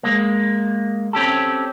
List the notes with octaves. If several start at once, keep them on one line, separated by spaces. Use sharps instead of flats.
G#3 A#3
C4 C#4 G4 A4